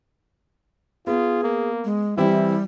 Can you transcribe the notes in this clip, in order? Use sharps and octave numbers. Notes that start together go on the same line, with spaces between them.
B3 F4 G#4
A#3
G#3
E3 G3 C4 E4 G4